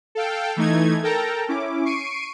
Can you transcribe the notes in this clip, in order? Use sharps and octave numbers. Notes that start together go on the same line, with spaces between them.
A4 F5 G5
E3 A3 D#4 G#6
A4 A#4 G5 A5 A#5
C#4 E4 D6
C#6 C7 D7 D#7